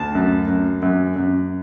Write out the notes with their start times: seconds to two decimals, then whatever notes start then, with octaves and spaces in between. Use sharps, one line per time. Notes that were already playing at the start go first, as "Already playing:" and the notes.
Already playing: D2 A5
0.15 F#2
0.48 F#2
0.82 F#2
1.16 F#2